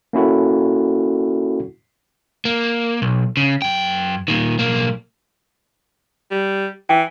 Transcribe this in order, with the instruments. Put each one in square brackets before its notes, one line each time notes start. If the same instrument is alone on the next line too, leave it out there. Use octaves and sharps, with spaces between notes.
[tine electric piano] A#3 C#4 E4 F#4 A4
[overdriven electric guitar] A#3
B1
C#3
F#2 G5
A#2 D#3
B1 A#3
[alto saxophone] G3
[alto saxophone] E3 [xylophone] G5